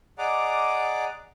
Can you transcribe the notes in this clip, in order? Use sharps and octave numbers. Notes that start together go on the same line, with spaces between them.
G#4 D5 D#5 F#5 A#5 D6